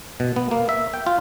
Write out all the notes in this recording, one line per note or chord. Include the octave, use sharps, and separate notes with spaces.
B2
B3
A#3
E5
G5
F4